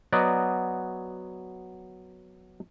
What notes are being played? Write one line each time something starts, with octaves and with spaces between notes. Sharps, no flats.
F#3 B3 F#4 D5 D#5